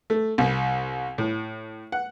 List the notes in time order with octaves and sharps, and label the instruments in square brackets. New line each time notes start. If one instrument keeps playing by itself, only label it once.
[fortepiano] A3
C2
A2
F#5